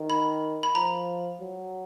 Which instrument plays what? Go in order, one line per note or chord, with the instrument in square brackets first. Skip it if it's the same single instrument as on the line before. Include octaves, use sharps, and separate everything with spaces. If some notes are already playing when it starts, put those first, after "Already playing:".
Already playing: [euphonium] D#3
[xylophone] B5
B5
[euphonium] F3 [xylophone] A#5
[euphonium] F#3